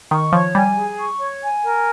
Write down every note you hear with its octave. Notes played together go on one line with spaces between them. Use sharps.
D#3 C#6
F3 C#5
G3 G#5
G#4
C#6
C#5
G#5
A#4